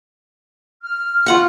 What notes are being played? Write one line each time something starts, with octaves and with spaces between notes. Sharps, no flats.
F6
F4 F#5 C#6